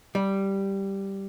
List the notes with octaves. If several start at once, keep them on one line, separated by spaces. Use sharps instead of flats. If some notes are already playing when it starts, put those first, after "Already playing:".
G3